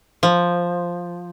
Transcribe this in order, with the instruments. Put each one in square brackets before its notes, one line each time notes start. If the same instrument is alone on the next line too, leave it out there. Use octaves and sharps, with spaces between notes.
[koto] F3